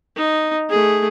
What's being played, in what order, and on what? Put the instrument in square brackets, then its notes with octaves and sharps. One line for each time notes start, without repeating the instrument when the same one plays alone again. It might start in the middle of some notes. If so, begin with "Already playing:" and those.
[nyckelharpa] D#4
A3 G#4